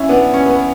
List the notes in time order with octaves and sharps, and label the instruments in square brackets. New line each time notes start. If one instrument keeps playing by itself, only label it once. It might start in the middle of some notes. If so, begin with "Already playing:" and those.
Already playing: [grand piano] C#4 E4
B3 D4
C#4
B3